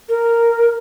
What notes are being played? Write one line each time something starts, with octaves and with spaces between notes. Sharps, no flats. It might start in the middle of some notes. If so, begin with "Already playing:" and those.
A#4